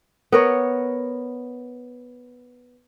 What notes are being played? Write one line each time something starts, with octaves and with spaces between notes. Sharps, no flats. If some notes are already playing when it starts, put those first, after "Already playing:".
B3 A#4 C#5